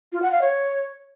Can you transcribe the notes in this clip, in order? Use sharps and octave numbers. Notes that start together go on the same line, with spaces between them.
F4
F#5
F5
C#5